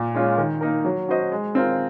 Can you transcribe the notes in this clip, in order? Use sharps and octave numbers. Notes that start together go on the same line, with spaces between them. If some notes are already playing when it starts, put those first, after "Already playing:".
Already playing: A#2
G#3 C#4 F4
D#3
A#3 D#4 A#4
F#3
C#4 F#4 C5 D#5
G#3
C4 F4 A#4